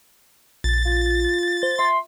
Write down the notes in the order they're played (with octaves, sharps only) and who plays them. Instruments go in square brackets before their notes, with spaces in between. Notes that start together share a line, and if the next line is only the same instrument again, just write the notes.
[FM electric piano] A#1 [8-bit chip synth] A6
[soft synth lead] F4
[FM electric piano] C5
[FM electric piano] E5 [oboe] C6